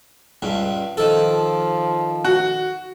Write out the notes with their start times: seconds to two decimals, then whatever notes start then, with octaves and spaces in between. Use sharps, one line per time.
0.42 C#2 G2
0.97 D#3 F3 A4
2.25 F#4